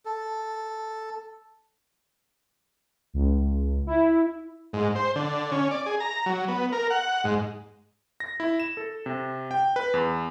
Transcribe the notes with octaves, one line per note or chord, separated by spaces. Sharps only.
A4
C#2
E4
G#2
C5
D3
C#4
D5
G#4
A#5
F#3
B3
A#4
F#5
G#2
A#6
E4
E7
A4
C3
G5
B4
E2